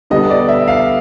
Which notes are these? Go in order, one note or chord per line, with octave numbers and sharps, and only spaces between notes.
D3 G3 B3 D#5
D5
E5
F5